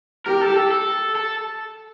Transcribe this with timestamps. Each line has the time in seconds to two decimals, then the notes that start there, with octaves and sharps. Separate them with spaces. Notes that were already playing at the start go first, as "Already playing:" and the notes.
0.26 G4 A#4
0.41 A4
0.57 A4
0.72 A4
1.16 A4